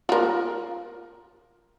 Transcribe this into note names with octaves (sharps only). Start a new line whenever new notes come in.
F4 A#4